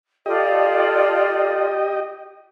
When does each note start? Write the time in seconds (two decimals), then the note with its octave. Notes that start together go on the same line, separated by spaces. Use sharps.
0.26 F4 G4 A4 D5 D#5